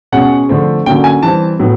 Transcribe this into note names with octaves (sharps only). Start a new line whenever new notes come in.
B2 G#3 C#4 F#5
D3 F3 A3 C4
D3 F#3 A#3 C#4 G5
G#5
E3 G3 C4 A5
A2 F#3 B3